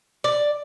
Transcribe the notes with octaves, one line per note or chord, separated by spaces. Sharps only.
D5